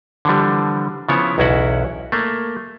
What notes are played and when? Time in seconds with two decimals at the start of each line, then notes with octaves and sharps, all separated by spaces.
0.25 D3 E3 F3 G3
1.09 C#3 F3 B3 E4 C#5
1.38 B1 E2 C#4 E4 F#4 F#5
2.12 A3 A#3